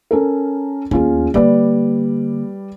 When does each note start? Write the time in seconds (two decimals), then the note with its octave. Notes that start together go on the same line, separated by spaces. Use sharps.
0.11 C#4 A4 A#4
0.91 D#2 A3 C#4 F4 G#4
1.34 D3 G3 A#3 B4 D5